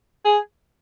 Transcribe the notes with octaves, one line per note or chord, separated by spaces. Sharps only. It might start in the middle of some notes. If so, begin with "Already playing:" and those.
G#4